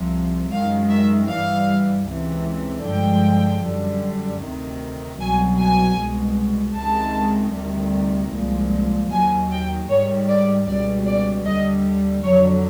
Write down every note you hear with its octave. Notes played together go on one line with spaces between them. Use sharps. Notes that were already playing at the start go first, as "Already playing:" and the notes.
Already playing: C2 C3 F3
F#2 D#3 G#3 F5
E5
G2 E3 G3 F5
C#2 C3 E3
G2 D3 F3 G#3 G5
F#2 D3 G3
D2 C3 D#3
C2 B2 F#3 G#5
G#5
C2 B2 G#3
C#2 C3 D#3 G#3 A5
D2 C3 D#3 G3
C2 A#2 F3 G#3
D#2 D#3 F#3 G#5
G5
G#2 D#3 G3 C#5
D5
C#2 B2 G3 D5
D5
D#2 D3 G3 D#5
F2 D3 F#3 C#5